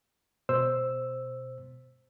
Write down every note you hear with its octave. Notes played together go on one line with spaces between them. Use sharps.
B2 C5 E6